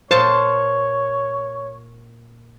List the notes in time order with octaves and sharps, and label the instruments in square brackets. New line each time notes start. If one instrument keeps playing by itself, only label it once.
[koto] A#2 A5 [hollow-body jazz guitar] C5 [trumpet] C#5